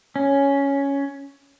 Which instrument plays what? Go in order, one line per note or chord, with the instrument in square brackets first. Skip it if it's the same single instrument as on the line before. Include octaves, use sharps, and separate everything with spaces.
[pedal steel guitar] C#4